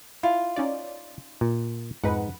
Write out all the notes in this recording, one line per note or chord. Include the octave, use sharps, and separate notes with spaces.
E4 F4
C#4 D#4 D5
A#2
F2 G#2 D#4 B4 F#5